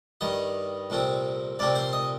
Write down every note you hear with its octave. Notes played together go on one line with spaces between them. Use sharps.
G2 D#3 G3 D#5
C2 A#2 A3 C4
C2 A#2 A3 C4 D5
C5
D#5